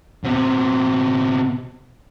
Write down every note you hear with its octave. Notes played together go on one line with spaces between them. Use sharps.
B2 C4